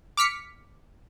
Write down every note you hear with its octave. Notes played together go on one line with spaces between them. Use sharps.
D6 F6 B6 C#7